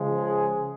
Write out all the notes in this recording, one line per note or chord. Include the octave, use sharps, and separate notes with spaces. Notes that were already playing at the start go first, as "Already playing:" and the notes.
Already playing: C#3 F3 G#3
G#4